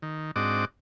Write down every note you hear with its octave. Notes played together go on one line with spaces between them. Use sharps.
D#3
G#2 C4 D4 F#4 D#5 D6